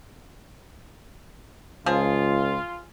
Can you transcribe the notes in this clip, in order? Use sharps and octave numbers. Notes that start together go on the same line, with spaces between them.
C#2 F3 F4 G#4